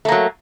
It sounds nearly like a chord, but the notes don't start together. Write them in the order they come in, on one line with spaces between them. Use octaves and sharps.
A3 A#3 F#3